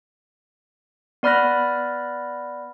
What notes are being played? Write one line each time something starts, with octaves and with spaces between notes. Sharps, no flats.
B3 D5 B5 F6 F#6 A#6